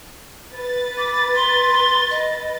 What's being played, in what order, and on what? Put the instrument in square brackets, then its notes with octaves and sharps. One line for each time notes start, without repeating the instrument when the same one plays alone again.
[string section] B4 A6
[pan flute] D6
C6
D#5